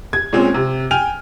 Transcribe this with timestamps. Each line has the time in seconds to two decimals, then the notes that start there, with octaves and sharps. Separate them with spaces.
0.13 G#6
0.33 A#2 G#3 C4 C#4
0.54 C3
0.91 G5 G#5 F6 F7